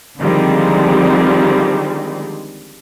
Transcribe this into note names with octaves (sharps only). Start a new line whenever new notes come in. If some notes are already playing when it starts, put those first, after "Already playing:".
D3 D#3 F3 G3 G#3 C4